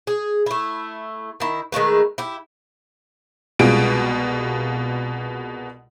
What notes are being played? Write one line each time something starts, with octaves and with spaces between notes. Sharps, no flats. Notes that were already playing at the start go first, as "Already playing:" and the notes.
G#4
A3 E4
D#3 E4
D#3 G#3 A3 B4
E4 G4
C2 B2 G#3 F4 D7